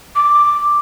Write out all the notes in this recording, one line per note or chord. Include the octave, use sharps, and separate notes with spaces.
D6